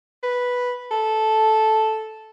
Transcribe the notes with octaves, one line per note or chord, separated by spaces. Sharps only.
B4
A4